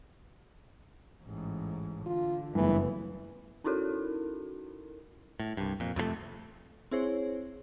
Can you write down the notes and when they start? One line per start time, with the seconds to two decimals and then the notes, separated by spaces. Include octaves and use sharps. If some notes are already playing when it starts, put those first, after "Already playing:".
1.23 A1 G#2
2.06 D3 F4
2.55 F#1 G2 E3 A3 B3
3.64 C#4 D#4 E4 F#4 A4 A#4
5.40 A2
5.57 C2 G2
5.80 F2 A#2
5.96 F2 C3 E3 A3
6.91 C4 E4 G#4 C5 C#5